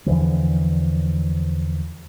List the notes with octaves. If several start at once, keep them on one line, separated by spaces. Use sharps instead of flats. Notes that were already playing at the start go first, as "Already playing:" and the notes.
E2 D3 E3 F3